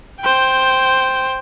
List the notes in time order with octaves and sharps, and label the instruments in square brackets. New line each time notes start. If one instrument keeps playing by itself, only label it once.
[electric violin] C5 G5